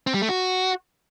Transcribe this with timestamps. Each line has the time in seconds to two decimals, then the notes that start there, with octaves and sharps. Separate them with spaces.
0.07 C4
0.14 G3
0.22 A3
0.29 F#4